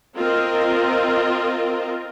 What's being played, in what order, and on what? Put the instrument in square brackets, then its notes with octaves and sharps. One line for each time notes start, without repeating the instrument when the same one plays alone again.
[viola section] C4 F4 A#4 D#5